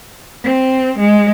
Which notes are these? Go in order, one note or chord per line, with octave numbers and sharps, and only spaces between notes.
C4
G#3